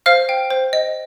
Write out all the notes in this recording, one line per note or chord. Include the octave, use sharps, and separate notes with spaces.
C5 F5 F6
G5
C5
D#5